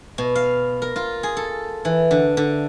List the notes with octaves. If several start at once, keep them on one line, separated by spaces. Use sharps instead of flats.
B2
F5
A#4
F4
G#4
A4
E3
D3
D3